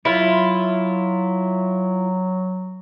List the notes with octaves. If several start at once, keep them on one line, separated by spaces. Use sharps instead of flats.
F#3 E4 F4